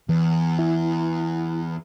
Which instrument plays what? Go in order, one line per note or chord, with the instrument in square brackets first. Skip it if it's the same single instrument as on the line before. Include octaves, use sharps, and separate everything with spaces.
[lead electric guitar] E2 [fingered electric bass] E3
[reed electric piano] E4